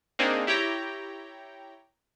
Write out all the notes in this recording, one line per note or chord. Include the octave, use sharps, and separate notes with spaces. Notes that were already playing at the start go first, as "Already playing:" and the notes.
A#3 C4 D4 D#4 G#4
E4 G4 C#5 G5 A#5